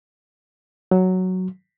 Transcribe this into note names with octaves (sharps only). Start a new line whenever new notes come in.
F#3